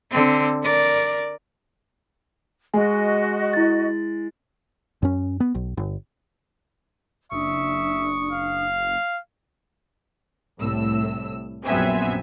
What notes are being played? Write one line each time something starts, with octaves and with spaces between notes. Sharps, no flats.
D3 C4
A#4 D5
G#3 F#4 D#5 G#5
E4 A6
F#2 C#4
B3
B1
G1
F#1 D4 E5 C#6 D#6
F5
C2 A2 E6
A#1 F#2 B3 C4 E5 G#5